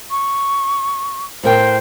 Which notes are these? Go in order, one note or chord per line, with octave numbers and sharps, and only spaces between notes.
C#6
A2 A#4 C5 G5